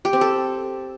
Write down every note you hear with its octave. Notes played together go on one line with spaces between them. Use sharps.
G4
C4
A4